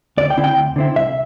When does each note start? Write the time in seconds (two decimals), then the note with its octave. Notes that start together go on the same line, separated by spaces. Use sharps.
0.17 D2 D5
0.30 G5
0.37 D3 C4 E4
0.44 G5
0.57 D2
0.76 D3 C4 E4
0.96 C2 E5